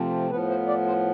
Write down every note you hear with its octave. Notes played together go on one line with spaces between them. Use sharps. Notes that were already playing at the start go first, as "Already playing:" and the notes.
Already playing: C3 F3 A3 C4
A2 F3 B3 B4
C5
D5
C5